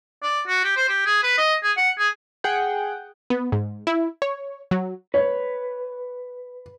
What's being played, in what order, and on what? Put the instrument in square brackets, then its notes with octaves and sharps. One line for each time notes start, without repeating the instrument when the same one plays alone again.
[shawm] D5
F#4
G4
C5
G4
G#4
B4
D#5
G#4
F#5
G#4
[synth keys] G#4 F#5 G5
[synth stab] B3
G#2
E4
C#5
F#3
[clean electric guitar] B4 [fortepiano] C#5